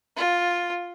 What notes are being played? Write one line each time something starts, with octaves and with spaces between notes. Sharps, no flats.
F4